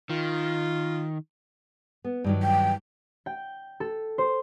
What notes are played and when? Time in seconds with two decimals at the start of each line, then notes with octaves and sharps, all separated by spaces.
0.10 D#3 F4
2.04 B3
2.24 G2 D#3 F#3
2.43 G5
3.26 G5
3.80 A4
4.18 C5